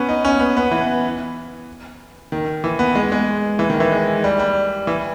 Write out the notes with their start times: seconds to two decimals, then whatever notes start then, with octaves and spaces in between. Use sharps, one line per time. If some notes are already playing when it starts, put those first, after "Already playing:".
Already playing: B3 C#4
0.09 D#4
0.25 C#4
0.40 B3
0.57 B3
0.71 E3
2.32 D#3
2.64 E3
2.79 B3
2.95 G#3
3.12 G#3
3.59 E3
3.70 D#3
3.80 E3
3.92 G#3
4.24 G3
4.39 G3
4.87 E3